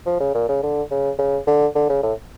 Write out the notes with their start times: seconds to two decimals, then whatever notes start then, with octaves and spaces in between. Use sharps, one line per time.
0.06 F3
0.20 C#3
0.35 A#2
0.49 C#3
0.63 D3
0.91 C#3
1.19 C#3
1.47 D3
1.75 D3
1.90 C#3
2.03 A2